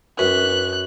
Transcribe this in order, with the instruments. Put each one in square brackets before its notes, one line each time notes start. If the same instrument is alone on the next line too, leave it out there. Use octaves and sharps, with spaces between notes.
[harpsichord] F#2 [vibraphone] B4 [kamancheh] F#6